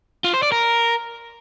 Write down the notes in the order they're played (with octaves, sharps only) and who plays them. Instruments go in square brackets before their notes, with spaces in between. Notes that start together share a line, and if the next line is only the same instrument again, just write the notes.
[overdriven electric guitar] F4
C5
D5
A#4